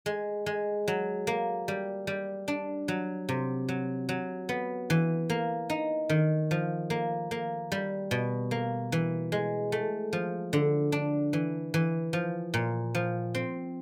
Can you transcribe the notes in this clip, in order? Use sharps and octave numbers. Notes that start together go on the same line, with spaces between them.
G#3
G#3
F#3
A#3
G3
G3
D4
F#3
C3
F#3
F#3
B3
E3
A#3
D#4
D#3
F3
A#3
A#3
G3
B2
A#3
E3
G#3
A3
F3
D3
D4
E3
E3
F3
A#2
F3
C4